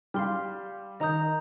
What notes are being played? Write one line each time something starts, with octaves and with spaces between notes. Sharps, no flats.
G3 G4 F5 C6 F6
D#3 D#4 D#5 A#5 D#6 G6